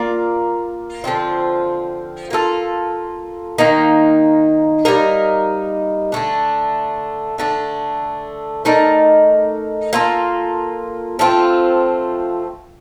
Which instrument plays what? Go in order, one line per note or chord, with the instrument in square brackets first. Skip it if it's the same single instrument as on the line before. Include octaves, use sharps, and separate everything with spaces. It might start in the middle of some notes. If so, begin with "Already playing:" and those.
Already playing: [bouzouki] A#3 F4 A#4 D5
D3 F3 C4 F4
A#3 F4 A4
D#3 A#3 D#4
G3 A#3 D#4 A#4
D3 A3 D4
D3 A3 D4
A3 D#4 A#4 D5
A#3 F4 A4
F3 A3 C4 F4